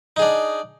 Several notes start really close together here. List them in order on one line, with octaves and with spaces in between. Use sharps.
D#4 G#4 D4